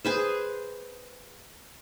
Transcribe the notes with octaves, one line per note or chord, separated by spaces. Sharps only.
G#4 B4 C5